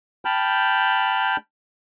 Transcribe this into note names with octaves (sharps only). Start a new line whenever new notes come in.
G5 A5 B5 F6 G6